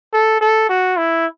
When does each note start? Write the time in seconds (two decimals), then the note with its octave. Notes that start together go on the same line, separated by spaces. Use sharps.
0.13 A4
0.41 A4
0.69 F#4
0.97 E4